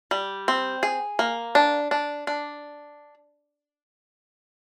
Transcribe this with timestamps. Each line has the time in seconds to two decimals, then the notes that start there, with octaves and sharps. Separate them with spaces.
0.11 G3
0.48 C4
0.83 G#4
1.19 A#3
1.55 D4
1.91 D4
2.27 D4